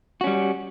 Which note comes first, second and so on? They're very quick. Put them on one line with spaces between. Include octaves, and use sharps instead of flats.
F#4 C#4 G3